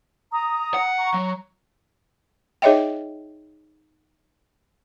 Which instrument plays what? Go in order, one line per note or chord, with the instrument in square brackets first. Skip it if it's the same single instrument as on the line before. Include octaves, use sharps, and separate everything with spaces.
[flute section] A#5 D#6
[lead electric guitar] F#5
[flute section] A#5 C#6
[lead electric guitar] F#3
[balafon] D#4 G#4 C#5 D#5 E5 G5